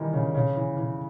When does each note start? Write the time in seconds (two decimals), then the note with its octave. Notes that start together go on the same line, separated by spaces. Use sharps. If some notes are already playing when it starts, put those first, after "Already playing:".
Already playing: D#3 E3 G3
0.13 C#3
0.35 C#3
0.55 E3
0.77 E3